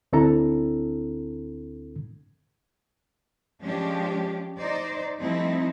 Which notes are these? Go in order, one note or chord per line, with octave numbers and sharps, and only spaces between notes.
D2 C4 D4 E4 A4 A#5
F3 G#3 C#4 D4 G4
D#4 C5 D5
F3 G3 A3 C4 D#4 E4